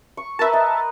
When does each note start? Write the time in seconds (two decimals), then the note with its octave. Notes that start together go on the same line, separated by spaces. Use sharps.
0.17 C#6
0.39 A#4 B4 E5 A5 A#5
0.53 D#5